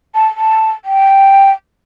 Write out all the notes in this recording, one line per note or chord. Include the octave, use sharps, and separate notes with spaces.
A5
A5
G5